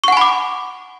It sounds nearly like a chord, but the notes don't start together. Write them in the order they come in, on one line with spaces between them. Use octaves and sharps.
C#6 F#5 G#5 B5 D6